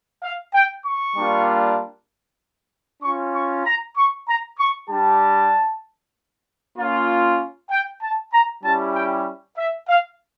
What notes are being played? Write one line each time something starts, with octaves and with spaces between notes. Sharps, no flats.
F5
G5
C#6
G3 A#3 D4 F4
C#4 F4 C#6
C#6
A#5
C#6
A#5
C#6
G3 D4 G4 A5
A#3 C#4 F4
G5
A5
A#5
G3 C#4 E4 G4 A5
G5
E5
F5